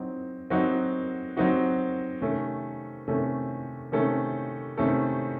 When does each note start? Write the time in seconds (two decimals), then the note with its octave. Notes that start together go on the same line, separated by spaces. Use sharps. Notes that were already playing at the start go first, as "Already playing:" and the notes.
Already playing: F#3 C4 D#4
0.50 F#3 C4 D#4 F#4
1.37 F#3 C4 D#4 F#4
2.22 C3 D#3 A3 C#4 A4
3.08 C3 D#3 A3 C#4 A4
3.92 C3 D#3 A3 C#4 A4
4.77 C3 D#3 A3 C#4 A4